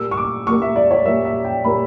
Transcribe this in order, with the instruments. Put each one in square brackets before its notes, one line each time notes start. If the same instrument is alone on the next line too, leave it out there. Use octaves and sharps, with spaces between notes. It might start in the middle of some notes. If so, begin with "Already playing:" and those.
Already playing: [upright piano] A#2 G3 A#3 E6
C#6
D6
A#2 G3 A#3 C#6
E5
D5
C#5
A#2 G3 A#3 E5
E5
G5
A#2 G3 A#3 B5